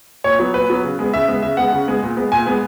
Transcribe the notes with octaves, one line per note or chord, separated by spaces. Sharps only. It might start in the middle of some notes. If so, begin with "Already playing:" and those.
A#2 C#5
F#3 B3
A#2 B4
F#3 B3
C#3
G#3 B3
C#3 E5
G#3 B3
C#3 E5
G#3 B3 F#5
C#3
G#3 B3
A#2
G#3 B3
A#2 G#5
G#3 B3